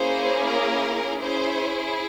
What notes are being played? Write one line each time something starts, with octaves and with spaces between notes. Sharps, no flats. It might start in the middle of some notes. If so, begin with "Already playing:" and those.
Already playing: A#3 C#4 E4 G#4 C5
A#4
C#4 E4 G#4 C5